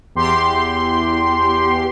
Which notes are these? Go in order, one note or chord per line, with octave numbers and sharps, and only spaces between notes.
E2 G4 C6